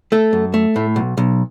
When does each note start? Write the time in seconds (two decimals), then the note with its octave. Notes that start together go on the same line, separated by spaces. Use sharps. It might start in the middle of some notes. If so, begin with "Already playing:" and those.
0.12 A3 A4
0.33 F#2
0.54 A3
0.76 A2
0.96 B1
1.17 B1